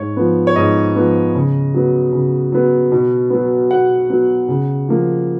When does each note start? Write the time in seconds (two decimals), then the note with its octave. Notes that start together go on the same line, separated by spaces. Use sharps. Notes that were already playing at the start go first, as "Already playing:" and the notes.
Already playing: G#2 C#5
0.17 F3 B3
0.47 C#5
0.56 G#2 D#5
0.96 F3 B3
1.35 C#3
1.74 F#3 B3
2.13 C#3
2.52 F#3 B3
2.92 B2
3.30 F#3 B3
3.71 B2 F#5
4.10 F#3 B3
4.48 C#3
4.88 F3 A#3